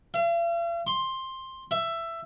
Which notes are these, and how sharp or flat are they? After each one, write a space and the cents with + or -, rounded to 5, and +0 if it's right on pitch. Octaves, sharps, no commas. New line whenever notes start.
F5 -45
C6 +10
E5 +15